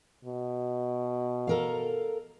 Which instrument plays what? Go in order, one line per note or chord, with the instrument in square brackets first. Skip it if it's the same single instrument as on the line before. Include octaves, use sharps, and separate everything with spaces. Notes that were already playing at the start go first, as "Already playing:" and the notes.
[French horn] B2
[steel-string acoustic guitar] A4 A#4 F5